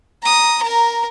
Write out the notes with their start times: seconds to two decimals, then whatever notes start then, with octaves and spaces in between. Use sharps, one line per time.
0.22 A#5 D#6
0.62 A#4 A#5